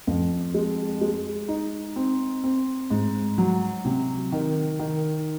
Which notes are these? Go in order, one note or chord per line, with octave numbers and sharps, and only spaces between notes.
F2
G#3
G#3
D#4
C4
C4
G#2
F#3
C3
D#3
D#3